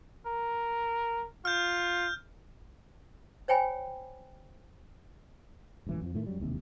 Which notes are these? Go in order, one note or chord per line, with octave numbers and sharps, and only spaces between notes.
A#4
F4 F6 G6
C5 C#5 G5 G#5 B5
E1 A1 E3
F2 F3
A2 D#3 A3
F#2 F#3 G3
E1 D#2 C3